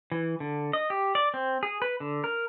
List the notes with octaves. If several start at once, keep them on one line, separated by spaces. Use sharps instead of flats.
E3
D3
D#5
G4
D5
C4
G#4
B4
D3
A#4